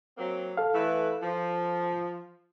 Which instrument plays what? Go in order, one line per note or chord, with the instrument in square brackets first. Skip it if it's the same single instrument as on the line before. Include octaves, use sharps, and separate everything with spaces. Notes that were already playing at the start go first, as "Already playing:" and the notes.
[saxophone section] F#3 A#3 C4
[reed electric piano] A4 F5
[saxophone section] E3 A3 B4
F3